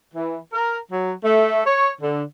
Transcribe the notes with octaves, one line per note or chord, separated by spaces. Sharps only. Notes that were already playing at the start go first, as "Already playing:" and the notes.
E3
A#4
F#3
A3
C#5
D3